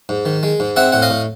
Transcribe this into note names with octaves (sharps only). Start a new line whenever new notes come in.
G#2
D#3
G#3
G#2
C4 E5 F#5
A2 F#5
D#5 F5
A2